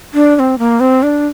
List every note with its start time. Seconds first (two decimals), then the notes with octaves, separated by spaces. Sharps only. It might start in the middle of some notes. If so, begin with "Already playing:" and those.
0.14 D4
0.36 D4
0.39 C4
0.59 A#3
0.80 C4
1.03 D4